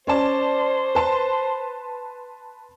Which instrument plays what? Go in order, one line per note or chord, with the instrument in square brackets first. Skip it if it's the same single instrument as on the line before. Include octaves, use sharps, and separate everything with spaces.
[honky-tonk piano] C#4 D5 A5 [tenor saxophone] C5
[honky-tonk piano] B4 A5 C6